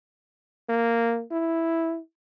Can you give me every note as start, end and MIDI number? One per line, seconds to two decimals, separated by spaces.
0.69 1.23 58
1.31 1.99 64